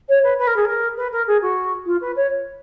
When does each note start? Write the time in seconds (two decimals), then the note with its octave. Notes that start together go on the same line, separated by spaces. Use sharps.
0.09 C#5
0.23 B4
0.38 B4
0.47 A#4
0.56 G#4
0.65 A#4
0.97 B4
1.12 A#4
1.27 G#4
1.42 F#4
1.86 F4
2.01 B4
2.16 C#5